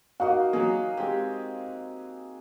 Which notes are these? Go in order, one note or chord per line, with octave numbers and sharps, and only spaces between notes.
A#3 D#4 F#4 F5
F#3 A#3 G#4
G#3 C4 G4